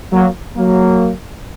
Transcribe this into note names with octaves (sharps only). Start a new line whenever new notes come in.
F#3 A#3
F#3 A#3